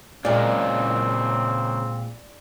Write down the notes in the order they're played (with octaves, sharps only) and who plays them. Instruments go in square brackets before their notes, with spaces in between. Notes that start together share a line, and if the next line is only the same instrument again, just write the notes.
[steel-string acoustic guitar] A#2 G#3 [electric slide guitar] C#3 F4 A#4 [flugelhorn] C4 [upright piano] D5